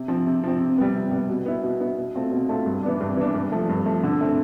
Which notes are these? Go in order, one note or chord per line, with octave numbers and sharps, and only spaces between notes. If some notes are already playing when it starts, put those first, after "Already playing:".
Already playing: C3
F3 C4
C3
F3 C4
C3
G3 B3
C3
G3 B3
B2
B3 E4
B2
B3 E4
B2
A3 C4 F4
B2
A3 C4 F4
G2
E3 B3 D4
G2
E3 B3 D4
G2
F3 A3
G2
F3 A3
D3
A3 C4